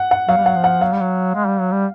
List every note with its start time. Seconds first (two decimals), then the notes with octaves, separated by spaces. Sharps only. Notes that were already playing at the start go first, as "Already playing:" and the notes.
Already playing: F#5
0.11 F#5
0.28 F#3 F5
0.37 G3
0.44 F#3 F#5
0.56 F3
0.64 F#5
0.81 F#3 F5
0.92 G3
1.00 F#3
1.35 G#3
1.47 G3
1.59 F#3
1.71 G3